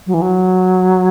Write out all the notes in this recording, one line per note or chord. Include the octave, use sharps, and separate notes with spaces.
F#3
E3
F#3